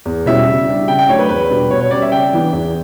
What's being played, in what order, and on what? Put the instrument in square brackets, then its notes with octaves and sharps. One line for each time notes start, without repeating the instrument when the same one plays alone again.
[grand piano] E2
B2 G3 C#4 E4 E5
C#3
G3 D4
C#3 G5
G5
F#3 A3 D4 C#5
B4
E2 B4
B2 G3 D4
B2 C#5
C#5
G3 C#4 D5
E5
C#3 G5
E3 B3 D4
E2